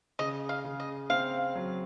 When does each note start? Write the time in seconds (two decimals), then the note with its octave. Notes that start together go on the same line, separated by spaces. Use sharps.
0.19 C#3 D#5
0.49 F5
0.64 C#3
0.80 D#5
1.10 C4 F5
1.55 F#3